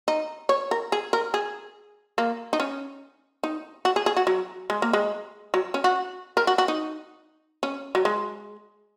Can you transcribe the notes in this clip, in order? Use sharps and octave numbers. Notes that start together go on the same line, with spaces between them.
D#4
C#5
A#4
G#4
A#4
G#4
A#3
D#4
C#4
D#4
F#4
G#4
G#4
F#4
F#3
G#3
A#3
G#3
F#3
C#4
F#4
A#4
F#4
F#4
D#4
C#4
F#3
G#3